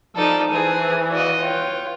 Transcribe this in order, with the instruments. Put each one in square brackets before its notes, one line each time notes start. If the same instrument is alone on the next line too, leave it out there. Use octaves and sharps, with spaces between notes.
[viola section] F3 [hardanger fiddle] D#4 A4 [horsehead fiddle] D5
[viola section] E3 [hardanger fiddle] G#4 [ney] B4 [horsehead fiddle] C5
[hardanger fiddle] F#4 D#5 [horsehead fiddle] D5 F5
[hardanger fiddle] F4 [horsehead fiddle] C#5 G5